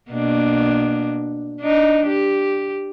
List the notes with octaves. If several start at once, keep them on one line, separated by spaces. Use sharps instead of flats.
B2 A#3 D4
D4 D#4
G4